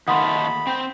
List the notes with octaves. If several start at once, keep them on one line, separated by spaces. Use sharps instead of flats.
D#3 A3 A#3 F#5 B5 C6 D#6
C4 G5